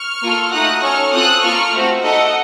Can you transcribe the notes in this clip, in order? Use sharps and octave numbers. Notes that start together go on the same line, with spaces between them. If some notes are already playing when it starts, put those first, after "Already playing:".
Already playing: C#6 F6
A#3 F4 A4
A3 D#4 F#4 D#6 F#6
C#4 A4 C#6 F6
C4 F4 A4 D#6 F#6
A#3 F4 A4 C#6 F6
A3 C4 F#4
A3 D#4 A4 D#5 F#5